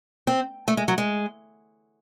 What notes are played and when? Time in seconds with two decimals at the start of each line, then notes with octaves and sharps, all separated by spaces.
0.27 C4
0.68 A3
0.77 G#3
0.88 F#3
0.98 G#3